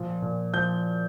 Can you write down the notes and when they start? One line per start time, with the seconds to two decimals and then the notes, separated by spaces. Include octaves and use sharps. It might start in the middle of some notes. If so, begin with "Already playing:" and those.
Already playing: A#2 F3
0.22 A#2
0.53 F3 G6